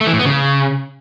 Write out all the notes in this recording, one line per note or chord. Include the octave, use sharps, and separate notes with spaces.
A3
E3
A2
B3
C#3